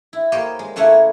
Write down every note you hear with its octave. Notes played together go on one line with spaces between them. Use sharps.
E4
A#3 G4 C5 C#5 D#5
G#3
C#3 A3 A#3 E4 B4 C#5